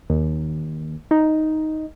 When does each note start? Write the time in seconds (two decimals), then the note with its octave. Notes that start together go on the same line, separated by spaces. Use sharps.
0.10 D#2
1.11 D#4